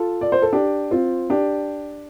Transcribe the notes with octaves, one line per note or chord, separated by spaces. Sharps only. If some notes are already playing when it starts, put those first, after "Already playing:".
Already playing: F4 A4
D5
C5
A4
D4 G4
C4 F4
D4 G4